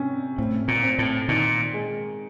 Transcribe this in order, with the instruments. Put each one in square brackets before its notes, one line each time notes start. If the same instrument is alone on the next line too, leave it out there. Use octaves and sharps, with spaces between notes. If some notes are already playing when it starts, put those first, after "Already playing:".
Already playing: [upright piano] C3 C#4
[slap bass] A2 [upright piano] C4
[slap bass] A#2
[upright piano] C4
[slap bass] A2
[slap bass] A#2 [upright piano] D#3
[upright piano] G#3